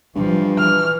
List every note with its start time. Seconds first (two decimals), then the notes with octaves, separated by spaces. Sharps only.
0.15 G2 E3 F3
0.58 E3 F6